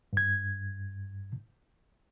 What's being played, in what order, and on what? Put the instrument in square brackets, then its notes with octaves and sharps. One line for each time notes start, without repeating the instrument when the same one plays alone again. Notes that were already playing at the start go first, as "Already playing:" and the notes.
[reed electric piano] G2 G#6